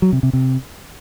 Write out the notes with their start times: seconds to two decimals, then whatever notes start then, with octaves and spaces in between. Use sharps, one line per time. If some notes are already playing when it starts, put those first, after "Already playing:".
0.02 F#3
0.13 C3
0.23 C3
0.33 C3